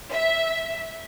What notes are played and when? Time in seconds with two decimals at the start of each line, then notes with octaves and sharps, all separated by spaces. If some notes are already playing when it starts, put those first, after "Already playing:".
0.12 E5